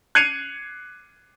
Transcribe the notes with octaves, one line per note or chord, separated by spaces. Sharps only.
F#6 G#6 C7 C#7 D#7 F7